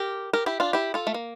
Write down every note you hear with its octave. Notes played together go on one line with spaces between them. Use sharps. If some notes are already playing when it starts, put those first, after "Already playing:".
Already playing: G4 A#4
G4 A#4
E4 G4
D4 F4
E4 G4
F4 A4
A3
A#3